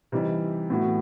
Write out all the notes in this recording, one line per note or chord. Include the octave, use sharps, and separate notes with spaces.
C3 E3 G3 D#4
A2 E3 B3 F#4